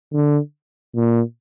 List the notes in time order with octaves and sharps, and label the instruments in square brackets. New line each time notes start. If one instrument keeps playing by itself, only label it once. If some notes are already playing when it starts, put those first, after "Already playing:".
[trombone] D3
A#2